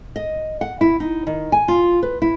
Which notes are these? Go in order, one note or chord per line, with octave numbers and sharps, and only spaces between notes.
D#5
F#5
E4
D#4
D#3
G#5
F4
B4
E4